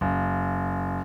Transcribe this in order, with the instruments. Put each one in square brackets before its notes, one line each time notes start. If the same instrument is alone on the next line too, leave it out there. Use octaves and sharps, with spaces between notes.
[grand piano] F#1